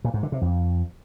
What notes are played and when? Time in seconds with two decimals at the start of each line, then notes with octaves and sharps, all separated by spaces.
0.04 A#2
0.14 G#2
0.23 D3
0.32 C3
0.41 F2